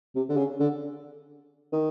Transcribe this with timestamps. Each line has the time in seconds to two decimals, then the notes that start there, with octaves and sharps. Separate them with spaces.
0.15 C3
0.29 D3
0.37 C#3
0.60 D3
1.73 D#3